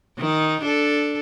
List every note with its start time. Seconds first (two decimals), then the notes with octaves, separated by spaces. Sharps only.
0.18 D#3 D#4
0.61 D4 A4